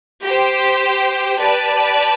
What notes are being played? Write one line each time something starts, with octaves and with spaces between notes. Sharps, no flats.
G4 C5 G5
G4 B4 D5 A5